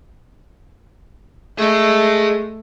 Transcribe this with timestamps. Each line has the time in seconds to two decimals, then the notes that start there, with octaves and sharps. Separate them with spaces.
1.58 A3 G#4 D#5